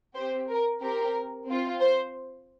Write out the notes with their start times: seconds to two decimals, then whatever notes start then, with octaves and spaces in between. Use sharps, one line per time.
0.15 C4 G4 C5
0.48 A#4
0.81 C4 G4 A#4
1.47 C4 F4
1.80 C5